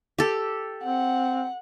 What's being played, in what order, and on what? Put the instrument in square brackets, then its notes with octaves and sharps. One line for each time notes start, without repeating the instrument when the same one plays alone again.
[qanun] G4 A4
[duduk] C4 [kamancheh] F#5